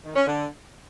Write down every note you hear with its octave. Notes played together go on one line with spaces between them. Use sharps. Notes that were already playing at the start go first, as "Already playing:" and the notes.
D#3
C#4
D3